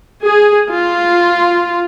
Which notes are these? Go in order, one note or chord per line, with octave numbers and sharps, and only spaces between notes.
G#4
F4